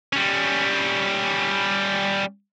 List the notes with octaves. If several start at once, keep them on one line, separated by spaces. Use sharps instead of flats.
G3 C#4